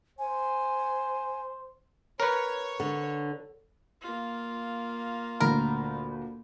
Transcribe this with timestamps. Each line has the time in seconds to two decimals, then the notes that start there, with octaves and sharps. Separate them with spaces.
0.19 C5 G#5
2.20 A#4 B4 C#5
2.80 D3
4.02 A#3 F4
5.40 D2 A#2 A#4 B5